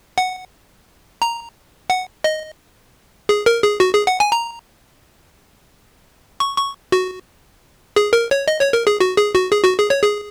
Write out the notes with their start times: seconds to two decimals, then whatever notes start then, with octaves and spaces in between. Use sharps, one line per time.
0.18 F#5
1.22 A#5
1.90 F#5
2.24 D#5
3.29 G#4
3.46 A#4
3.63 G#4
3.80 F#4
3.94 G#4
4.07 F#5
4.20 G#5
4.32 A#5
6.40 C#6
6.57 C#6
6.92 F#4
7.96 G#4
8.13 A#4
8.31 C#5
8.48 D#5
8.61 C#5
8.73 A#4
8.87 G#4
9.00 F#4
9.17 G#4
9.35 F#4
9.52 G#4
9.64 F#4
9.78 G#4
9.90 C#5
10.03 G#4